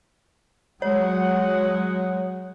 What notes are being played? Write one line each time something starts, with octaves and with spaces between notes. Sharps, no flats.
F#3 G#3 C#5 F#5